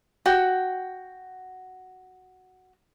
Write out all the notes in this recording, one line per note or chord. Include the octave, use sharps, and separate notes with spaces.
F#4 G5